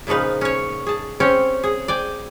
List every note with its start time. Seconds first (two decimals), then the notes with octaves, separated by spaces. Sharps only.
0.07 A#2 C#3 F3 D#4 B4
0.41 C#4 C#5
0.86 G#4 A5
1.20 C4 C#4 C#5 G5
1.63 G#4
1.88 D5 G5 G#5